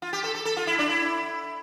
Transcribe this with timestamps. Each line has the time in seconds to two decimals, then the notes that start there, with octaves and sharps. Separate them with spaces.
0.02 F4
0.13 G4
0.24 A4
0.35 A4
0.45 A4
0.57 F4
0.67 E4
0.79 D4
0.89 E4